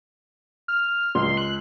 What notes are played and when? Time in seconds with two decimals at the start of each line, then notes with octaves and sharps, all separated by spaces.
0.68 F6
1.15 C#2 C6
1.37 F#6